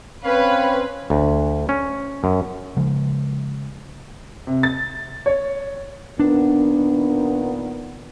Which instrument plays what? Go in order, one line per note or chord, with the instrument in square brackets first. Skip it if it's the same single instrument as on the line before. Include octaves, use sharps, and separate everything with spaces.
[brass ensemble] C4 C#4 [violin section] B4 [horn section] C#5 F5
[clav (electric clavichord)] D2
C#4
F#2
[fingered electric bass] C#3 F3 G#3
[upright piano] C3
A6
C#5
[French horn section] A#2 D#3 B3 [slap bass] D4